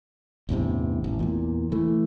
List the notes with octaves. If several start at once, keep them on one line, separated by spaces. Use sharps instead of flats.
A1 E2 G2 C3
A1
E2 A#2
E3 A3